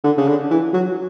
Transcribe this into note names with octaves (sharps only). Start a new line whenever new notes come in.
D3
C#3
D3
E3
F#3